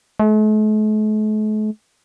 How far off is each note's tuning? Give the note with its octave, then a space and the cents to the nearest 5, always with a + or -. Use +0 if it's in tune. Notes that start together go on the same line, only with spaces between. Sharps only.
A3 -45